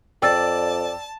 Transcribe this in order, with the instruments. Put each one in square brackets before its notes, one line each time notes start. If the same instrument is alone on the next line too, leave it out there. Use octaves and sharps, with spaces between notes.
[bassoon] F2 [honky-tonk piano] D5 [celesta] G5 E6 A6 [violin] A5